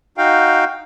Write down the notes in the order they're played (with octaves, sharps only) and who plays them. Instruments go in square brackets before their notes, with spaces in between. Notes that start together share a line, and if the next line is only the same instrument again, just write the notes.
[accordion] D#4 F#4 F5 G5